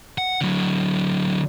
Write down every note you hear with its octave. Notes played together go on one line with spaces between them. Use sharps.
F#5
D3 F#3